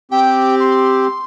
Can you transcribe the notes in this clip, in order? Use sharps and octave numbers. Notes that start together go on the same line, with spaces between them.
C4 G4 G5
C6